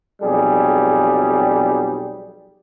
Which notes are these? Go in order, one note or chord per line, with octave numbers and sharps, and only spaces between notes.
B1 F2 G3 G#4